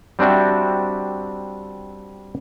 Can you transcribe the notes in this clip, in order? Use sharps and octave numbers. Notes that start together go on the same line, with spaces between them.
G3 C4 D4 F#4 E5